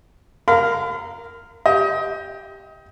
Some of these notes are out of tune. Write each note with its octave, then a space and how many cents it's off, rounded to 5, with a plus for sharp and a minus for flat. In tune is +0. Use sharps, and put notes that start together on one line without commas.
A#4 +0 F5 +0 B5 +45
G4 +0 D#5 +30